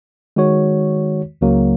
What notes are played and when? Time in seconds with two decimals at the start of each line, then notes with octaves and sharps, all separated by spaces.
0.36 D#3 G#3 F#4 C#5
1.41 C#2 C#3 F#3 A#3 F#4